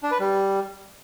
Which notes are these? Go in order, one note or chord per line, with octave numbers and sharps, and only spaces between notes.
D4
B4
G3